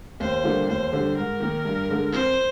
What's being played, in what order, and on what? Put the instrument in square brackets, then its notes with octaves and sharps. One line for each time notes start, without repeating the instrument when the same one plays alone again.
[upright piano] D#2 [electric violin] C5
[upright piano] D3 G3 A#3 F4
[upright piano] D#2 [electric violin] C5
[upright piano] D3 G3
[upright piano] G#2 [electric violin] A#4
[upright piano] D#3 A#3
G2
D3 G#3
[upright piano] F2 [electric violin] C5